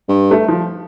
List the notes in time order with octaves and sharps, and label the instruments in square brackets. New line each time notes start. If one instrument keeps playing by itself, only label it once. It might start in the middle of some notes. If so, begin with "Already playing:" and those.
[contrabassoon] G2
[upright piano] A3
F3